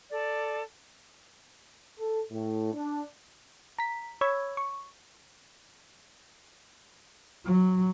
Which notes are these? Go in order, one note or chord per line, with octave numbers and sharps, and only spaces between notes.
A4 D5
A4
A2
D4
A#5 B6
C#5 B5 C#6 E6 G#6
C#6
F#3